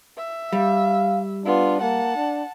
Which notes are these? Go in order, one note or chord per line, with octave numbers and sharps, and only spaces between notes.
E5
G3 F5
B3 D4 F4
A#3 F#5 A5
D4